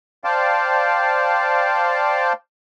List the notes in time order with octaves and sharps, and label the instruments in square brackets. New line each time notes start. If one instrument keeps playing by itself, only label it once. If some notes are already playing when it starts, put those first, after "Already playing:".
[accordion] C5 D5 F5 G5 A5